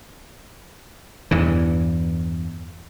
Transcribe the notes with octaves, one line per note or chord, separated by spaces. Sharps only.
E2 G2 E3